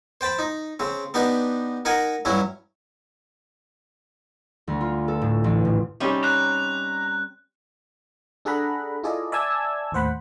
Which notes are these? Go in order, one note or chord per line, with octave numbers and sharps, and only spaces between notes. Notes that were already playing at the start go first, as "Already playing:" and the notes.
C5 G5 A5 B5
D#4
C#3 C4
B3 D4 D#4 G4
D#4 A#4 F#5 G#5
G2 F#3 C#4 E4
D2
F4
A4
A2
A1
A2
C3 G3 C4 C#4 D#4 G4
A#5 F#6
D4 G#4 A4 F#5 A#5 B5
E4 F4 G#4 A4 D5 D#5
D5 E5 G#5 A5 E6 G#6
D#2 A2 C5 F#5 B5